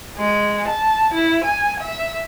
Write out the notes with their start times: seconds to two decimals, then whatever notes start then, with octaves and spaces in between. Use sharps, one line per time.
0.18 G#3
0.68 A5
1.14 E4
1.45 G#5
1.81 E5